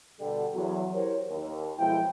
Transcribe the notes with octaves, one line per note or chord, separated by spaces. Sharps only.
B2 D3 G3 A4
E2 F#3
E4 G4 A#4 C5 C#5
D#2
B1 B2 F3 G#3 E4 G5